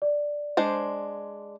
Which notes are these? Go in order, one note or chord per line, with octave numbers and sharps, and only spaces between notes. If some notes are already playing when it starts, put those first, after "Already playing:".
D5
G#3 D4 C5